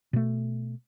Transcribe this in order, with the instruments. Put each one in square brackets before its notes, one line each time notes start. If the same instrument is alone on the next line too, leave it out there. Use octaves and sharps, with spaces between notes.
[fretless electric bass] B2 A3